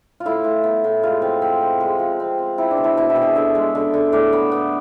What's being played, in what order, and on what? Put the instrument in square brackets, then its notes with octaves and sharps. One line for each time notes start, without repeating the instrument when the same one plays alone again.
[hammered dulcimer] F4
A2 E4
A2
B3
A2
G#3 F4
C4
C4
C4
G#3
F3
C4
C4
C4 E4
D4
B2
E4
B2 E4
E4
B2
G#4
D3 E5
G#3
D3
D3
A2 D5
B3
B3